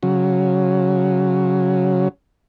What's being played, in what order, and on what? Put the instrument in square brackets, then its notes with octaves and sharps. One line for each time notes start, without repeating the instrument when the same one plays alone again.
[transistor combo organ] C#3 F#3